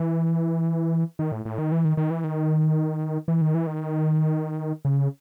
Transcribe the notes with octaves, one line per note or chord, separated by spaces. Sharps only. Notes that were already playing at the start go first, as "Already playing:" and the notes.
Already playing: E3
D#3
A2
A2
D#3
E3
D#3
D#3
E3
D#3
E3
D#3
E3
D#3
C#3